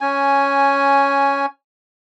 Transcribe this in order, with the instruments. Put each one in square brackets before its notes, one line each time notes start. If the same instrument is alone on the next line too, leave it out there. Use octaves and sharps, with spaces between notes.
[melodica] C#4 G#5